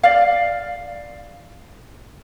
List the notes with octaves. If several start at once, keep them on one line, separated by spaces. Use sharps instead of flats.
D5 F5